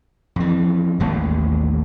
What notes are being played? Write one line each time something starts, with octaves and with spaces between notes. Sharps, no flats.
F2 E3
A1 D#2 G#3